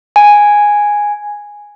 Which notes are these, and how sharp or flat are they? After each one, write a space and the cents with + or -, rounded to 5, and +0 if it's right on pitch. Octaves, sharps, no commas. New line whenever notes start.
G#5 -5